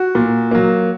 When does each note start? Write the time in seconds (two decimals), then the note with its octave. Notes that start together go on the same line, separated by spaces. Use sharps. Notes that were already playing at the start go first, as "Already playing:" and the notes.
Already playing: F#4
0.15 A#2
0.51 F#3 A#3